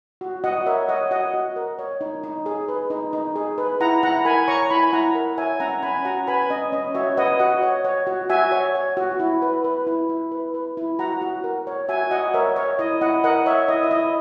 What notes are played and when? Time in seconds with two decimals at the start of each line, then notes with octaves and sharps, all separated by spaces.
0.21 F#4
0.44 F#4 D#5 F#5
0.66 A#4 C#5 E5
0.89 C#5 D#5 F#5
1.11 F#4 D#5 F#5
1.34 F#4
1.56 A#4
1.79 C#5
2.01 D#4
2.23 D#4
2.46 G#4
2.68 B4
2.90 D#4
3.13 D#4
3.36 G#4
3.58 B4
3.80 E4 F#5 A#5
4.03 E4 F#5 A#5
4.25 A#4 G#5 B5
4.48 C#5 A#5 C#6
4.70 E4 G#5 B5
4.93 E4 F#5 A#5
5.15 A#4
5.38 C#5 E5 G#5
5.60 C#4 F#5 A#5
5.83 C#4 G#5 B5
6.05 F#4 F#5 A#5
6.27 B4 G#5 B5
6.50 C#4 D#5
6.72 C#4 D#5
6.95 F#4 C#5 E5
7.17 B4 D#5 F#5
7.39 F#4 D#5 F#5
7.62 C#5
7.84 C#5
8.07 F#4
8.30 F#4 E5 G#5
8.52 C#5
8.75 C#5
8.97 F#4
9.20 E4
9.42 B4
9.64 B4
9.87 E4
10.09 E4
10.31 B4
10.54 B4
10.77 E4
10.99 F#4 F#5 A#5
11.22 F#4
11.44 A#4
11.67 C#5
11.88 F#4 E5 G#5
12.11 F#4 D#5 F#5
12.34 A#4 C#5 E5
12.56 C#5
12.79 E4 D#5
13.01 E4 D#5 F#5
13.24 A#4 D#5 F#5
13.46 C#5 E5
13.68 E4 D#5
13.83 E5
13.91 E4 D#5